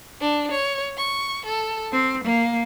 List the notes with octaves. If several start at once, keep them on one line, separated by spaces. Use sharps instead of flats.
D4
C#5
C#6
A4
C4
A#3